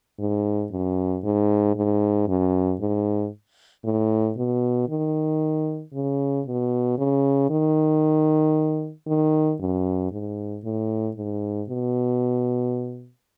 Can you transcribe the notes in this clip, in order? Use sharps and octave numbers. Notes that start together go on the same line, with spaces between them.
G#2
F#2
G#2
G#2
F#2
G#2
A2
B2
D#3
C#3
B2
C#3
D#3
D#3
F#2
G#2
A2
G#2
B2